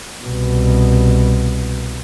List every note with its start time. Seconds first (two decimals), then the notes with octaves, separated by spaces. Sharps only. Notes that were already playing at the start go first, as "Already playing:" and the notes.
0.23 C2 B2